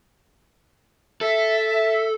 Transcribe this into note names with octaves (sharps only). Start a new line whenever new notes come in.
A4 E5